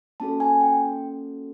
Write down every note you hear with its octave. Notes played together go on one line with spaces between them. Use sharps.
A#3 C#4 F#4 A4 A5
G#5
G5